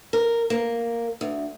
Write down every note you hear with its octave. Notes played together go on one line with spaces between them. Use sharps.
A#4
A#3
D2